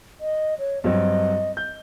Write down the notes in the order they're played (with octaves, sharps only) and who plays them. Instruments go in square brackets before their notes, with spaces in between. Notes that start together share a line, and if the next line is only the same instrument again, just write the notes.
[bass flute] D#5
C#5
[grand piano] G2 F#3 C4 [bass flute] D#5
[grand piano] G6